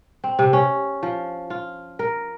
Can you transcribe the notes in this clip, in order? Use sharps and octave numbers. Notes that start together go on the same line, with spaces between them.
C4
C3
C#4
F3
F4
A#4